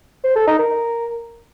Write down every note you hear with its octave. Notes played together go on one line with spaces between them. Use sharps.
C5
A4
D#4
A#4